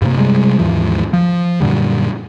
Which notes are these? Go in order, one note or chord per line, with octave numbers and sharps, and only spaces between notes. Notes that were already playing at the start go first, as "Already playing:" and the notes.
G2 C3 A#3
C3 G3 G#3
D#2 G#2 E3 F3
F3
F#2 A#2 D3 G3